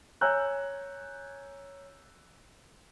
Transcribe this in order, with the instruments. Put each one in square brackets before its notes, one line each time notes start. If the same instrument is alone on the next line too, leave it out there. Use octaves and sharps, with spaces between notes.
[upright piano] C#5 G#5 A#5 E6 F#6 G6